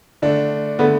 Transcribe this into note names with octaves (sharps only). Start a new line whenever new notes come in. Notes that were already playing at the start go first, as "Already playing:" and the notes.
D3 A3 D4
D3 A3 B3